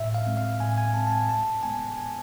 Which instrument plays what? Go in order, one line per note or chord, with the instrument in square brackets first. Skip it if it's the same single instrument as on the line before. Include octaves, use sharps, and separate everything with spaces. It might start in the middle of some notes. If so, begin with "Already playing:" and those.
Already playing: [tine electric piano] A2 E5
F5
G#3 C4
F5
A2 G#5
G#5
G#3 C4 A5
A5
G#5
G#2 A5
G#3 B3 G#5
G#5